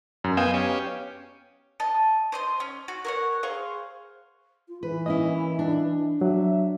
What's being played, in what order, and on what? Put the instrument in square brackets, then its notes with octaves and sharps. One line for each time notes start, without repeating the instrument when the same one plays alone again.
[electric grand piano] F#2
[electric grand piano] B3 F5 E7 [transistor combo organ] D#5 G5 G#5
[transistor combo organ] C#4 G4
[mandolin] D#5 A5
C5 D#5 C6
C#4
F#4
A#4 C#5 F#5
G#4 C5 F5 C#6
[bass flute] F4
[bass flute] E3 [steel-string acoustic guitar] B4
[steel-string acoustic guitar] A#3 C#4 E4 [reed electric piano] D#5
[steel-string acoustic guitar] D4
[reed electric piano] F#3 [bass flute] E5